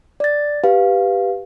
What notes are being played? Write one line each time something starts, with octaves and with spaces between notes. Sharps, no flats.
D5 A6
G4 B4 F5